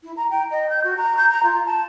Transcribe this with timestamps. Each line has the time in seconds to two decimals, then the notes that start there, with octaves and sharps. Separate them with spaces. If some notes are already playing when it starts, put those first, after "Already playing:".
0.03 E4
0.17 A#5
0.30 G5
0.51 D#5
0.69 G6
0.84 F#4
0.97 A#5
1.17 G6
1.31 A#5
1.43 F4
1.66 A5